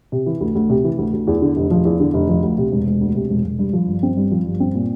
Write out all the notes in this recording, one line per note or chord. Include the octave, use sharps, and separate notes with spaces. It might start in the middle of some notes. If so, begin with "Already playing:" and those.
C3
E3
D2
D2
C3
E3
D2
D2
E2
D3
F1
F3
E2
D3
F1
F3
D2
C3
E1
E1
D2
C3
E1
E1
G2
F3
G1
C4
G2
F3
G1
C4
A#2